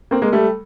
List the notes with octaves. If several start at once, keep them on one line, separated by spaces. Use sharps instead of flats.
A#3 C4
G#3 A#3
G3 A3